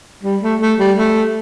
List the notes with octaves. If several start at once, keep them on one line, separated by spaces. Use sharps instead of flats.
G3
A3
A3
G3
A3